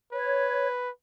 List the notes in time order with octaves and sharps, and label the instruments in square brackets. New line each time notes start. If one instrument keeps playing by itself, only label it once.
[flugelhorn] B4 [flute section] C#5